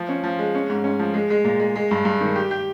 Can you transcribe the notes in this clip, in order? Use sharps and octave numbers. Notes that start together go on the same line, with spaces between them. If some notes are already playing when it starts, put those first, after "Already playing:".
Already playing: F3
C#4
F3
G#3
C#4
G#2
C#4
F3
G#3
G#3
A#2
G#3
G#3
G2
G2
D#3
G4
G4